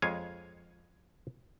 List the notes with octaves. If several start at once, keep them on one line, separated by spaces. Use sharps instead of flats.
F2 G#3 C#5 F5 G#5